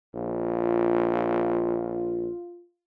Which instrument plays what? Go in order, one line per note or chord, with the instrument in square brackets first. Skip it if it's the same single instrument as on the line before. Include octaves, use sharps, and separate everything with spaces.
[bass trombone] A#1 [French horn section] F4